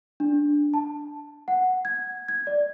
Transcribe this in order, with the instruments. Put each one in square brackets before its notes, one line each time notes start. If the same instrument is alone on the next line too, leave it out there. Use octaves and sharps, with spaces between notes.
[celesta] D4
A5
F#5
G#6
G#6
D5